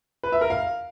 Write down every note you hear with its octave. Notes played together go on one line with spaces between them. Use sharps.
B4
E5
A#4
F5